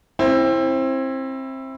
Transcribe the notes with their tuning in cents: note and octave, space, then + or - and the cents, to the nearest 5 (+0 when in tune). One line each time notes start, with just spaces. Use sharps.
C4 +25 E4 +0